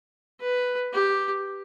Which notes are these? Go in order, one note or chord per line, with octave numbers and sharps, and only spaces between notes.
B4
G4